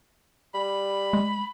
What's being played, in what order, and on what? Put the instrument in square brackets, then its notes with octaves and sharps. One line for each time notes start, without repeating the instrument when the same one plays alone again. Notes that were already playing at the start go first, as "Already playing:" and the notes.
[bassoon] G3 [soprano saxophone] B5
[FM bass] G#3